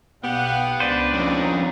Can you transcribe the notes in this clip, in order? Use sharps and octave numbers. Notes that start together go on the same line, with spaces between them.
B1 G3 B3 G4 F5 F#5
C#2 D4 B4 C5 D5
F2 C#3 D#4